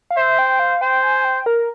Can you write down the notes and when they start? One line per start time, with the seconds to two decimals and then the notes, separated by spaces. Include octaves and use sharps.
0.10 F5
0.17 C5 E5
0.39 G5
0.59 F5
0.81 C5 G5
1.03 G#5
1.25 G5
1.46 A#4